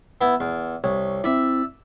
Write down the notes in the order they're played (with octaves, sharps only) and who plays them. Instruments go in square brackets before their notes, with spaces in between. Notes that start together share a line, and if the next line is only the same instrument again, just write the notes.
[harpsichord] B3 E4
E2
[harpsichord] C2 [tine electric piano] C#5
[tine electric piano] C4 E4 [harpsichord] D5 E5